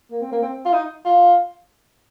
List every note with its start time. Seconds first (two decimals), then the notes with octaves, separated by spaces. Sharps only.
0.11 A#3
0.21 C4
0.32 A#3
0.42 C4
0.65 F4
0.73 D#4
1.05 F4